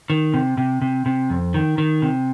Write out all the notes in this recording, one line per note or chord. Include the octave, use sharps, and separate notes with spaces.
D#3
C3
C3
C3
C3
F2
D#3
D#3
C3